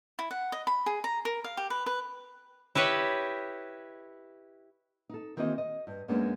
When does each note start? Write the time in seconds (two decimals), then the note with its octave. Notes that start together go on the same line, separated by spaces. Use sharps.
0.19 E4
0.31 F#5
0.52 D#5
0.67 B5
0.86 G#4
1.04 A#5
1.25 A#4
1.44 F5
1.57 G4
1.70 B4
1.86 B4
2.75 E4 G4 B4 C#5 D#5
5.09 D#4 A4
5.37 D#3 E3 A#3 C4 F#4 D#5
5.58 D#5
5.87 G2
6.08 F#2 G#3 A#3 B3 C#4 D4